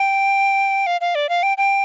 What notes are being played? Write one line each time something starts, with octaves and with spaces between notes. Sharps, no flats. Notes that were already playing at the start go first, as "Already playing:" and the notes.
Already playing: G5
F5
F5
D5
F5
G5
G5